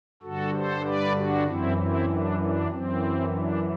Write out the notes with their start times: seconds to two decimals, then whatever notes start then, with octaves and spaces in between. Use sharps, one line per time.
0.23 G2 D3 F#4 A4
0.54 A4 C5
0.85 B4 D5
1.16 D4 F#4
1.46 F#2 E3 C4 E4
1.77 C4 E4
2.09 D4
2.39 D4
2.70 F#2 E3 C4
3.33 D4